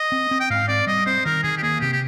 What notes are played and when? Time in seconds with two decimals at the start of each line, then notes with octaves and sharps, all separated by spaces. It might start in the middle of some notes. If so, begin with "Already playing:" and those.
Already playing: D#5
0.12 C4
0.31 C4
0.40 G5
0.50 G#2 F5
0.68 C4 D5
0.87 G3 D#5
1.06 C4 C5
1.25 D#3 A#4
1.43 D#3 G#4
1.58 G4
1.63 A#3 G#4
1.81 C3 G4
1.93 G4